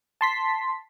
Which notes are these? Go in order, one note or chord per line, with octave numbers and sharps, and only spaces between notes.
A5 C6 B6